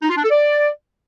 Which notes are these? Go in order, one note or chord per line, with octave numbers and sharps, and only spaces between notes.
D#4
F4
D4
A4
D5